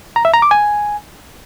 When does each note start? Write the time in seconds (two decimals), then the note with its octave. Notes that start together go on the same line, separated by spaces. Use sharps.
0.16 A#5
0.25 E5
0.34 A#5
0.42 D6
0.51 G#5